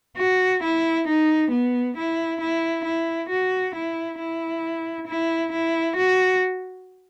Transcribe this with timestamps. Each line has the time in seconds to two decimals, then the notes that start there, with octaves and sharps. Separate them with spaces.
0.17 F#4
0.63 E4
1.07 D#4
1.51 B3
1.96 E4
2.40 E4
2.84 E4
3.29 F#4
3.74 E4
4.19 E4
5.07 E4
5.52 E4
5.96 F#4